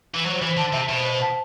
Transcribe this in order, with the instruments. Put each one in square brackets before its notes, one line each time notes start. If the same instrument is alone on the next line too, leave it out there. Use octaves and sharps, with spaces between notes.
[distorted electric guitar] E3
[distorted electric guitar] F#3 [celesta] C5
[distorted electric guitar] E3 [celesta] C5
[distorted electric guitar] D3 [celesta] A5
[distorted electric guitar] C3 [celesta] E5
[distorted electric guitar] B2 [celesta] C5
[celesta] C5
A5